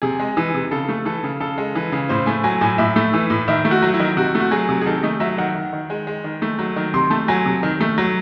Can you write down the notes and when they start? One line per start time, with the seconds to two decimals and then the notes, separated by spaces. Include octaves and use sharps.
0.02 C3 G#4
0.20 G#3
0.37 E3
0.54 C3
0.71 C#3 A4
0.89 A3
1.05 E3 A4
1.24 C#3
1.40 C#3 A4
1.58 G#3
1.75 E3
1.92 C#3
2.09 A2 C5
2.26 A3 G#5
2.44 F#3 G#5
2.61 A2 G#5
2.78 A2 E5
2.96 A3
3.13 E3
3.30 A2
3.48 D#3 E5
3.65 A3
3.71 F#4
3.82 F#3
3.94 E4
4.00 D#3
4.17 C3 F#4
4.35 A3
4.40 F#4
4.51 F#3 G#4
4.69 C3
4.81 G#4
4.86 D#3 A4
5.03 A3 D#5
5.20 F#3 E5
5.38 D#3 F#5
5.55 D#3
5.73 D#3
5.90 G#3
6.07 G#3
6.24 D#3
6.42 A3
6.59 F#3
6.76 D#3
6.94 C3 C6
7.10 A3 A5
7.28 F#3 G#5
7.46 C3
7.63 D#3
7.80 A3
7.98 F#3